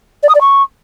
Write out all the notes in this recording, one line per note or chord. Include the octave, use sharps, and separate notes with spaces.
D5
D#6
D5
C#6